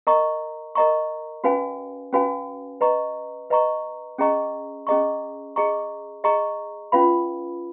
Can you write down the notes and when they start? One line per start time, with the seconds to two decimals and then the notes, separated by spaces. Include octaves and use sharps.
0.07 A#4 D#5 A#5 C#6
0.75 A#4 D#5 A#5 C#6
1.44 C#4 F#4 B4 F5 G#5
2.13 C#4 F#4 B4 F5 G#5
2.81 B4 D#5 A#5 C#6
3.50 B4 D#5 A#5 C#6
4.18 C#4 G#4 D#5 A#5 C#6
4.87 C#4 G#4 D#5 A#5 C#6
5.56 G#4 D#5 A#5 C#6
6.24 G#4 D#5 A#5 C#6
6.92 C#4 F4 B4 F5 B5